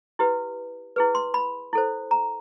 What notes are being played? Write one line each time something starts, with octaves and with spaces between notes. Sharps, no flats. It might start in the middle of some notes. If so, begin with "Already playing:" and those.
E4 G4 B4
E4 G#4 B4
C6
B5
E4 A4 C5
A#5